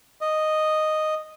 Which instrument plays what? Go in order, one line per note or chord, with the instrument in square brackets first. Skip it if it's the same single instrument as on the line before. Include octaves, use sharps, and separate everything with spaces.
[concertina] D#5